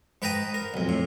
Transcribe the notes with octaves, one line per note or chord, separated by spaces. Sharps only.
G#2 B4 G5 A5 A#5 D#6
A#4
B1 F2
A2